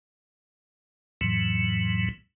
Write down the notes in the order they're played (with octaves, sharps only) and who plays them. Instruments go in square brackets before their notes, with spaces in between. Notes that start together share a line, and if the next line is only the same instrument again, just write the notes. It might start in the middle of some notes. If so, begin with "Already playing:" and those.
[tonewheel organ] F2 A2 E3 F#3